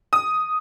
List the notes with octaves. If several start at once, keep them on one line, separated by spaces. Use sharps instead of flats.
D#6